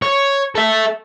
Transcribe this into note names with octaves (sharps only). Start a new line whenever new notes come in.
C#5
A4 E5